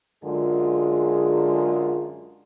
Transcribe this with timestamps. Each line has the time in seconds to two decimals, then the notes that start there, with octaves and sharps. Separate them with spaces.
0.24 F#2 D3 G#3 F4 G#4 A#4